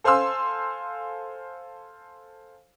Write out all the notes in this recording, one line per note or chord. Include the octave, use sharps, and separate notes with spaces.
A4 C5 F5 G#5 C6 E6